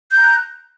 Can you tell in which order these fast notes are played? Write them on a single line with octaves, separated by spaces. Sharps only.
G6 A#5 F#6